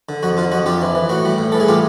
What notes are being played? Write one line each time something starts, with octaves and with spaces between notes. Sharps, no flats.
D3
F2 F#4
D3 F4
F2 F#4
F2 F4 G4
E3
E3
A2 F#4
G3
A2
E3 A4
G#4
A2 F4 G4